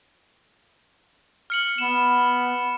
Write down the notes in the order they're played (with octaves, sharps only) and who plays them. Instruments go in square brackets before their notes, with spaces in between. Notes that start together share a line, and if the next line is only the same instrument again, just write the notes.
[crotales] F6 C#7 F#7
[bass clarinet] B3 [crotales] E7